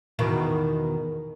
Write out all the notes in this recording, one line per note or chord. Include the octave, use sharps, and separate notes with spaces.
E2 B2 D#3